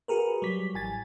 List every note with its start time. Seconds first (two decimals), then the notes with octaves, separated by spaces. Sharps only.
0.08 F#4 G#4 A#4 B4
0.42 F#3 G3 B6
0.74 A1 G#5 A6